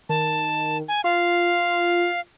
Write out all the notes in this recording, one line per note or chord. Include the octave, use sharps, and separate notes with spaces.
D#3 A5
G#5
F4 F5